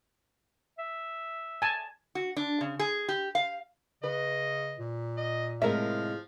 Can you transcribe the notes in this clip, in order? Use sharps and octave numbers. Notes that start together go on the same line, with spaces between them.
E5
G#5 A5
F#4
D4
C#3
G#4
G4
F5
C#3 B4 D#5
A#2
D#5
A2 C3 F3 G#3 A#4 E5 F5